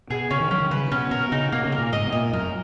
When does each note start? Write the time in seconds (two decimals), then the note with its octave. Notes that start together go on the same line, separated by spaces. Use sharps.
0.10 B2 G#4
0.31 C#3 C#4
0.41 D#3
0.51 F#3 C#4
0.61 D#3
0.71 C#3 B4
0.92 B2 C#4
1.11 B2 A#4
1.32 C#3 D#4
1.52 B2 A#3
1.65 C#3
1.72 A#4
1.78 A#2
1.93 G#2 D#5
2.05 B2
2.12 A#2 D#5
2.33 F#2 A#4